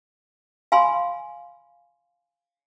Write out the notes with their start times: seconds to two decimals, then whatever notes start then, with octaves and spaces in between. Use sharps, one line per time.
0.72 F5 G#5 B5 C6